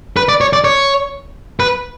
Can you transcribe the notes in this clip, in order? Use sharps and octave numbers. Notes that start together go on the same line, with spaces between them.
B4
D5
C#5
D5
C#5
B4